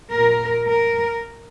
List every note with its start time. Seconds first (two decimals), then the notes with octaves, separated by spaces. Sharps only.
0.12 A#2 A#4
0.67 A#4